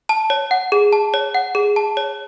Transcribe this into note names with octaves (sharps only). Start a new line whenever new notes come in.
A5
C#5
F#5
G#4
A5
C#5
F#5
G#4
A5
C#5